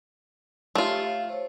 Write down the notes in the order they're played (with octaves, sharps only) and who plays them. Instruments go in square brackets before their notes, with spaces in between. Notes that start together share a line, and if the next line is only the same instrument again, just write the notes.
[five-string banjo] A3 F4 [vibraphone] G4 C#5
[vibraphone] F5
C5 C#5